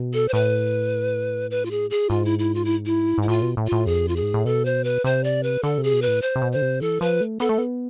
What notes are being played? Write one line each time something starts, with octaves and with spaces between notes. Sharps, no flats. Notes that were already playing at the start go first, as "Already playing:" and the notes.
Already playing: B2
A4
C5
A2 B4
B4
F4
G#4
G#4
G#2 F4
E4
E4
F4
E4
E4
G#2 E4
A2 F4
B2
A2
F4
A2
F2 G#4
F4
G#4
G#2
A2
B2 A4
C5
B4
C3 C5
D5
B4
D3 A4
C3
G#4
B2
B4
A2
C5
C3
B2
D3 C5
C3
E3 A4
F3 B4
A3
B3 A4
A3
B3